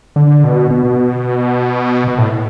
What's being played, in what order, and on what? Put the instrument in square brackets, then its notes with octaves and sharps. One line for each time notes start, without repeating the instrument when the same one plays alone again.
[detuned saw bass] D3
B2
B2
B2
A2